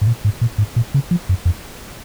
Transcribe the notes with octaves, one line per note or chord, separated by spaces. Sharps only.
G#2
A#2
G#2
A#2
G#2
A#2
C#3
F3
F#2
F2